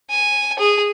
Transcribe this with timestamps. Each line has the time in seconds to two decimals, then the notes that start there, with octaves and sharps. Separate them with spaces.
0.11 G#5
0.59 G#4